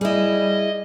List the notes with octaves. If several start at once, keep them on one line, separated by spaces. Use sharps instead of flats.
G3 E4 G#4 D#5